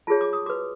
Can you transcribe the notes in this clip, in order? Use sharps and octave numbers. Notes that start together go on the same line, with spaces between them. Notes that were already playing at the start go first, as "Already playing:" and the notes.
F4 G#4 C#5 A5
D6
D#6
F#4 B4 D6